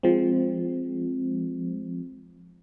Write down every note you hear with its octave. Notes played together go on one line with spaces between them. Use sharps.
F3 G#3 C4